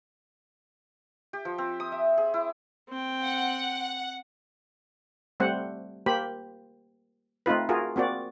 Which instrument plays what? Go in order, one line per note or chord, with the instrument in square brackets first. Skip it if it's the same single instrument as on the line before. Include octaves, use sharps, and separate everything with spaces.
[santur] G4
F3
C4
D#6
E5
G#4
E4
[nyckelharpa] C4 G5
[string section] F#5
[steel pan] G3 A3 C4 C5 F#5
A#3 G4 C5 B5
A3 C4 D#4 F4 B4
F4 F#4 G#4 A#4
A#3 C4 F#4 D5